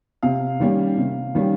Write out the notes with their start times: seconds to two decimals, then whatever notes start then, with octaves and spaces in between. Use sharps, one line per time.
0.23 C3 F5
0.60 D#3 G3 A#3 C#4
0.97 C3
1.35 D#3 G3 A#3 C#4